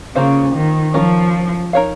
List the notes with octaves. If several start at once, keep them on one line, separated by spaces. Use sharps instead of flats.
C#3 A#3 F4 C5 F5
D#3
F3 C#4 F4 A#4
D#4 A#4 C#5 F5